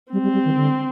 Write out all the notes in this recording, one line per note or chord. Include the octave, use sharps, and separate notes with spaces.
G3 C4
G3
G3
D#3
D3